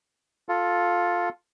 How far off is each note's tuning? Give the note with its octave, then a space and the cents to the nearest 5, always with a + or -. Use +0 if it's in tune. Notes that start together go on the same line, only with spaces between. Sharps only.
F4 +10 A4 +0